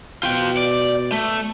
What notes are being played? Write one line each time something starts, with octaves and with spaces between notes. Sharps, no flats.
B2 F4 G5
D5
A3